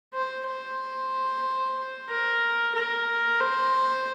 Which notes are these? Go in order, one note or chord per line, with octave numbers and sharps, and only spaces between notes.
C5
C5
A#4
A#4
C5